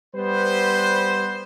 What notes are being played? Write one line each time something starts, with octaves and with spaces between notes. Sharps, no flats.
G3 B3 B4 C5